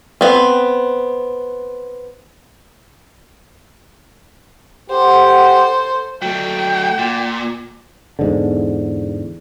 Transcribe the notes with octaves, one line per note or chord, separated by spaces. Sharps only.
B3 C4
G4 A4 C5 F#5
F#3 A3 G5
A#2
E2 G#2 D3